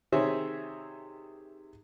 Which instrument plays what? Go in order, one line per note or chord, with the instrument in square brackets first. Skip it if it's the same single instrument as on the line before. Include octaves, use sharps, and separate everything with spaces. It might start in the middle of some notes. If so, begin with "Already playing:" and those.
[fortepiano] C3 D#3 G#4 C5 C#5 E5